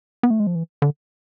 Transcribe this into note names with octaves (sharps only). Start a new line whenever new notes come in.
B3
A3
G#3
F3
E3
D3